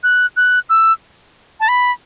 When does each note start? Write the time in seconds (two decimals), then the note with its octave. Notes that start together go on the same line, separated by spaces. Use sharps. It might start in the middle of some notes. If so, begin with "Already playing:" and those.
0.03 F#6
0.36 F#6
0.69 E6
1.60 A5
1.68 B5